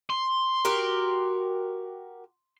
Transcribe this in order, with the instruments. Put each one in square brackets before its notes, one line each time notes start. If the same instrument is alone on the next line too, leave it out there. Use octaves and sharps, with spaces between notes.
[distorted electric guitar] C6
[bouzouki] F#4 G4 A#4